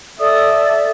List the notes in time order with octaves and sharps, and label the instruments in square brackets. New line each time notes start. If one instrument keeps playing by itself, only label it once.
[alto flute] A4 [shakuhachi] D5 [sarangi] E5 [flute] D#6